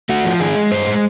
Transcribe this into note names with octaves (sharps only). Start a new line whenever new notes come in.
A3 F#4
F3
D#3 G#4
G#3
G2 C5
G#3